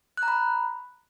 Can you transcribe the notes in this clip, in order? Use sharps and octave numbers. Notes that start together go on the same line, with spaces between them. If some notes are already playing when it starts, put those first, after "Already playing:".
F#6
A#5
B5